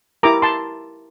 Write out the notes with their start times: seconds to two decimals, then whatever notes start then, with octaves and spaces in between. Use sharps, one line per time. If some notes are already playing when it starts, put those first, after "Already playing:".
0.23 E4 G4 A#4 A#5 D6
0.42 A5 C6